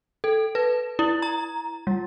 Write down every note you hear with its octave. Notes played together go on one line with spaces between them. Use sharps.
A4
B4
E4
A#5
G3